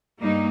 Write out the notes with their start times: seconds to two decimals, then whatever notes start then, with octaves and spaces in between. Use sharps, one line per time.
0.20 G2 G3 A#3 D#4